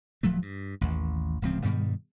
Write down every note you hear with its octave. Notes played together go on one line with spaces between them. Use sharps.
D1 F3 F#3 A3
G2
A1 D#2
D1 C#2 F3 C4
G2 B2 D#3 G3